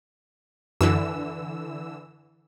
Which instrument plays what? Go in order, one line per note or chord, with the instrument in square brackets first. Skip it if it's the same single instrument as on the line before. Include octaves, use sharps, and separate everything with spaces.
[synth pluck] F#2 [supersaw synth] D3 E3 E6